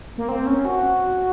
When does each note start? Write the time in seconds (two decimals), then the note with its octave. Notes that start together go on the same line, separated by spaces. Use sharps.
0.18 A#3
0.29 C4
0.47 C#4
0.65 F#4